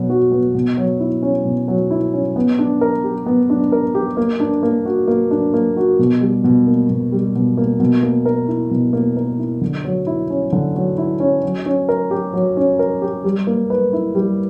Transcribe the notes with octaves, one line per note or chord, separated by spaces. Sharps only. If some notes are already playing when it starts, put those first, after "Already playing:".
Already playing: B2 F#3 B3
F#4
B3
B2
F#3
E4
C#4
B2
F#3
E4
C#4
B3
D4
A#4
G4
B3
D4
A#4
G4
A#3
D4
A#3
F#4
A#3
D4
A#3
F#4
B2
G3
B2
A#3
B2
G3
B2
A#3
B2
A#3
A#4
E4
B2
A#3
A#4
E4
D3
F#3
E4
C#4
D3
F#3
E4
C#4
F#3
C#4
A#4
G4
F#3
C#4
A#4
G4
G3
A#3
B4
E4
G3